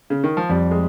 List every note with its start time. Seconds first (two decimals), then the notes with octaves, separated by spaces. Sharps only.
0.10 C#3
0.24 D#3
0.37 F3
0.50 F2 G3
0.71 G#3